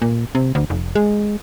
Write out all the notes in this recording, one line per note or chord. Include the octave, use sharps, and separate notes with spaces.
A#2
C3
D2
F1
G#3